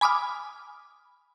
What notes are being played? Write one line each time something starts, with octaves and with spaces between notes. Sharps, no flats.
G#5 B5 D6 D#6 F6